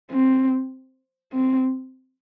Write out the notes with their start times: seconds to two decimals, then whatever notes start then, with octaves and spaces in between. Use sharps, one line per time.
0.11 C4
1.33 C4